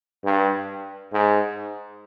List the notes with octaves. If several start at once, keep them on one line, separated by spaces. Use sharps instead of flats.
G2
G#2